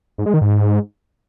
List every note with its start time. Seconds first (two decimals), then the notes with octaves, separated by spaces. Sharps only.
0.18 G#2
0.26 G#3
0.34 D#3
0.41 G#2